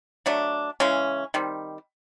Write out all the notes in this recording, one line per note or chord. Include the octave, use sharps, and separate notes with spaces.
F#3 A3 D4
C#3 E3 G#3 C#4
D#3 G3 C4